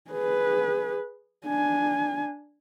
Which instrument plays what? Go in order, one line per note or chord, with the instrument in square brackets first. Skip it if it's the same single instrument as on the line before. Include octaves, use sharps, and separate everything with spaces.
[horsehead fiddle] G#4 B4
D4 G#5